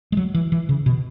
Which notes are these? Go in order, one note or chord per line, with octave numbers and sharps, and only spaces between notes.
G#3
F#3
E3
E3
C#3
B2